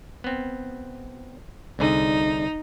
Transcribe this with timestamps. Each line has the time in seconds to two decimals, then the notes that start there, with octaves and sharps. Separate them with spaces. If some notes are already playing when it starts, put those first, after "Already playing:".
0.24 B3 C4
1.79 C2 D3 D#4 G#4